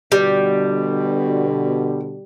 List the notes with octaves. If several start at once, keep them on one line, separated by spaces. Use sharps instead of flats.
B2 D3 G3